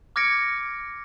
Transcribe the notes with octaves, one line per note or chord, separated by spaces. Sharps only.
D6 F6 G#6 A#6 C#7 D7